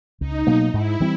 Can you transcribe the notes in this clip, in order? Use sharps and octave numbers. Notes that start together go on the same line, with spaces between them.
C#2 D#4
B2 F#3 A#3
G#2 E4
E3 G3 C4